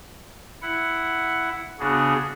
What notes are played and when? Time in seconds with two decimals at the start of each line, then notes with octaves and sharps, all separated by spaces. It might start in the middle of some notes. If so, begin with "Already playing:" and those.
0.62 E4 F#5
1.80 C#3 B3 D4 F#4 G#4